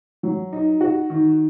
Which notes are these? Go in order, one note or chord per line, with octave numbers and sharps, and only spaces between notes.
F#3
D#4
F#4
D#3